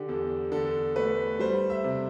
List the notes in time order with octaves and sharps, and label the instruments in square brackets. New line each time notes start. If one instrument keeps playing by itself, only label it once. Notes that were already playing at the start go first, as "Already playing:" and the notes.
Already playing: [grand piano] D3 G4
E2 A4
D3 A4
A3 B4
G3 C5
E5
C3